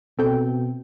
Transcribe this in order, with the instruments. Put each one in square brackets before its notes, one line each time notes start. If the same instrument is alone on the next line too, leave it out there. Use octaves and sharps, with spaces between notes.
[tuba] B2 [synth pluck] C4 A4 G5